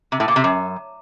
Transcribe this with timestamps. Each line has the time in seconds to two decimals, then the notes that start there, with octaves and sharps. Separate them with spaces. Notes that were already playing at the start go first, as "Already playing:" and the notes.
0.12 C3
0.20 A2
0.28 A#2
0.36 C3
0.44 F#2